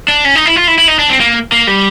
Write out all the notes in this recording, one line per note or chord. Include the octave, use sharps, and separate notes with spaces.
D4
C#4
D#4
E4
F4
E4
E4
D#4
D4
C4
A#3
A#3
G3